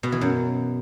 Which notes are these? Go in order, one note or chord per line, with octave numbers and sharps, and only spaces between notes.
B2
E3
F#2